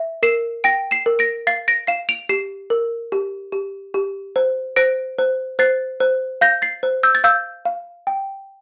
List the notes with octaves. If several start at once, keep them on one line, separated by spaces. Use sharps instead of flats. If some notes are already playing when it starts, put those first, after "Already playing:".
Already playing: E5
A#4 C7 E7
G5 A#6 D7
C7 E7
A#4
A#6 D7
F5 A6 C7
A#6 D7
F5 C7 E7
D7 F7
G4 C7 E7
A#4
G4
G4
G4
C5
C5 A#6 D7
C5
C5 A6 C7
C5
F5 G6 A#6
A6 C7
C5
E6 G6
A6
F5 E6 G6
F5
G5